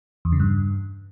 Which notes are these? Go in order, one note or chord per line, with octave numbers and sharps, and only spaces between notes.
E2
C#3
G2